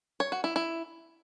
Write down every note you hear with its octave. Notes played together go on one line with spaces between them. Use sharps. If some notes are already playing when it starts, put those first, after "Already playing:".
C#5
F#4
E4
E4